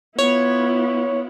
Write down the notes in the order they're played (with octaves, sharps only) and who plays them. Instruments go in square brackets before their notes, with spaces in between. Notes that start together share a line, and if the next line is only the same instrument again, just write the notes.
[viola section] B3 E4 F4 [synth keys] C#5